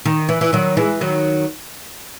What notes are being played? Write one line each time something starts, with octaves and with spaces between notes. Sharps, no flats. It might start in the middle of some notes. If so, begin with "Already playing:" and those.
D#3
E3
E3
D#3 F#3
E3 G#3
D#3 F#3